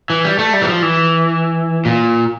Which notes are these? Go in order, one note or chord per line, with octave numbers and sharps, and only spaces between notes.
E3
G3
A3
G3
E3
F3
E3
A#2